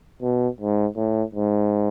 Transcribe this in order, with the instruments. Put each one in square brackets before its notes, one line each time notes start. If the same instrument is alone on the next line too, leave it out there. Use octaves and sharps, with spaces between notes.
[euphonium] B2
G#2
A2
G#2